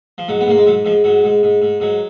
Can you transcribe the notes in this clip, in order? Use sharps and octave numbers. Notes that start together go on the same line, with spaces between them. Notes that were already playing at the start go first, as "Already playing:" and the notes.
F3
G#2 F#3
B3
G#2 A#3
G#3
G#2 F#3
G#2 F3
G#2 F#3
G#2
G#2
G#2
G#2 F#3